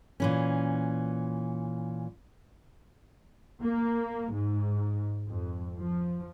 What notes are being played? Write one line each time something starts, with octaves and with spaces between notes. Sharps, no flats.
A#2 E3 C#4
A#3
G#2
F2
F3